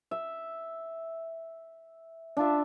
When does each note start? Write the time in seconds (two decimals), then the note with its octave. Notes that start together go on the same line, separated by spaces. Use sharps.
0.11 E5
2.37 D4 F4 E5